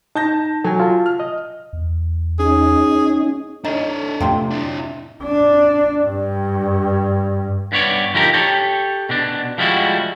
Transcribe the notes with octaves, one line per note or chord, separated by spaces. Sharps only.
D#4 A5 G6 A#6
F#3 A4 G#5
F4 A5
F6
D#5
E2
C#4 D#4 G#4
D4 D#4 A4 C#5
F2 A2 C3 F4 G4 C6
D4 E4
D4
G2
G2 B3 C#5 D5
D3 F3 D#4 G4 A#4
G4 A4 C#5
B2 D4
F3 G3 G#3 E4 F#4